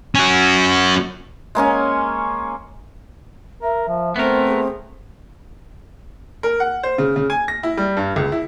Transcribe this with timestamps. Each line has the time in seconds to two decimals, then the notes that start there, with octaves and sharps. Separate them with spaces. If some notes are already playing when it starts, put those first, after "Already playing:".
0.15 C#4 F#4
1.55 G#3 A#3 C#4 G#5
3.62 A#4 E5
3.88 F3
4.16 A3 B3 C4 A#4 C5
4.47 G#4
6.43 A#4
6.60 F#5
6.83 C5
6.98 C#3
7.16 C#3
7.30 G#5
7.48 A#6
7.63 E4
7.77 G3
7.97 G2
8.16 C#2
8.32 E4